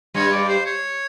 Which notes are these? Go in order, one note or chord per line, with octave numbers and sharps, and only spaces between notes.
G2 G3 C#5
D5
C5
C#5